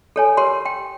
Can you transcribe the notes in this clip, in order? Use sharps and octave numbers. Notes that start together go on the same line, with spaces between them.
A4 C#5 G#5
G4 A#4 C#5 C6
G5